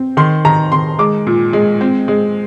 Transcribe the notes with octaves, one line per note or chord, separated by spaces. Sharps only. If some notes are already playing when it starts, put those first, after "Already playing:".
Already playing: C4
D#3 C6
D#3 A#5
D#3 C6
G#3 D6
A#2
G#3
C4
G#3